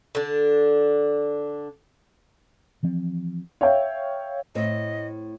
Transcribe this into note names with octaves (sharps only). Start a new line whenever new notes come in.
D3 D4
E3 F3 C4
C#5 E5 F5 G5
A2 C4 D#5